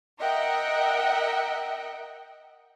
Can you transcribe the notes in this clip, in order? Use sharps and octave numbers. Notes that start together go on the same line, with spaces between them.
A#4 D#5 E5 F#5 G5